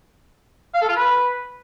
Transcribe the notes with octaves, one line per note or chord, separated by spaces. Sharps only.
F5
A4
F4
B4